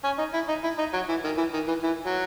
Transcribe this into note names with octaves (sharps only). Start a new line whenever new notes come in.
C#4
D#4
E4
D#4
E4
D#4
F#3
E3
D#3
E3
D#3
E3
E3
F#3